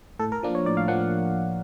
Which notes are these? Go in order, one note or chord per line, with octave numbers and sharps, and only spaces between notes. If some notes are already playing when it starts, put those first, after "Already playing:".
A2 A4
A#4
F3 A#3 D4
C#5
A2 D5
F5
F3 A#3 D4 F#5